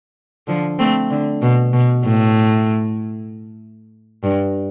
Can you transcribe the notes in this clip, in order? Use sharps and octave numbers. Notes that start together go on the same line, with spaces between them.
D3 F3
A3 C4
D3
B2
B2
A2
G2